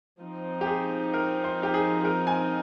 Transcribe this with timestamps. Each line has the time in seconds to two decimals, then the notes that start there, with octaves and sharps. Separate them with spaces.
0.21 F3 C4 D#4
0.61 G4
0.67 G#4
1.14 A#4
1.44 C5
1.63 G4
1.74 G#4
2.01 G#4
2.05 A#4
2.27 G#5